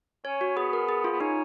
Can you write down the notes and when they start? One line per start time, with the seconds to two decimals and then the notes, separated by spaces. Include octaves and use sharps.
0.25 C#4 C#5
0.41 F#4
0.57 B3 G#4
0.73 A#4
0.89 G#4
1.04 F4
1.12 B3
1.20 C#4 D#4